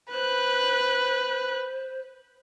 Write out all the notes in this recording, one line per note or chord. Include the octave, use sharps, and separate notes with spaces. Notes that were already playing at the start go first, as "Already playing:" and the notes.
B4 C5 F#6